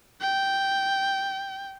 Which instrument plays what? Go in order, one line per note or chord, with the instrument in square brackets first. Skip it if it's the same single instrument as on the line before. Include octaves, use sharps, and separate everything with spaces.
[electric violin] G5